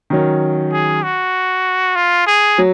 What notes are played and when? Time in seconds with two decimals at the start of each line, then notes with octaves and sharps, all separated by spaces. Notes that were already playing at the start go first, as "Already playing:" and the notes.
0.10 D#3 F#3 C#4
0.72 G#4
1.03 F#4
1.96 F4
2.27 G#4
2.58 F#3